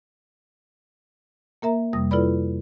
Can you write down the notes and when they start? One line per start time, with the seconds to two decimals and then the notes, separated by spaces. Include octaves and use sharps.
1.62 A#3 A#4 E5 A#5
1.93 F2 C3 G3 D#6 A#6
2.11 E4 F4 A4 B4 D5 B5